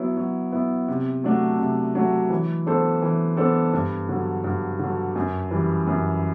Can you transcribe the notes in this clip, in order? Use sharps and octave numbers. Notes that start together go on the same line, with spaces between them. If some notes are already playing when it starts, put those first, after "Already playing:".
Already playing: F#3 B3 E4
F#3
B3 E4
C3
F#3 A3 D4 F#4
C3
F#3 A3 D4 F#4
E3
B3 D4 A4 C5
E3
B3 D4 A4 C5
G2
D3 F#3
G2
D3 F#3
F#2
E3 G3
F#2